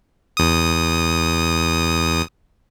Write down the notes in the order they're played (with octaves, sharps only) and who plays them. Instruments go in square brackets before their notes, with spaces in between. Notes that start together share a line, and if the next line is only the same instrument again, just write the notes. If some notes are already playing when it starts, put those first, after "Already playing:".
[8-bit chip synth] E2 D#6